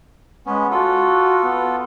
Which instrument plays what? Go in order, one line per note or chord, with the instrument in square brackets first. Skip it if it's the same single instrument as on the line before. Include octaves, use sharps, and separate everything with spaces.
[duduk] G#3 [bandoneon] B3 C#4
[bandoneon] F4 A4 [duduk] F#4
[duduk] B3